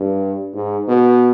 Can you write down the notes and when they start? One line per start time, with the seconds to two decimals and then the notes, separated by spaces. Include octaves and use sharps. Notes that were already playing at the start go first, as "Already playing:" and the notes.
Already playing: G2
0.54 G#2
0.88 B2